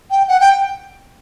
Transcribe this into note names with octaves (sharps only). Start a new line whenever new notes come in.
G5
F#5
G5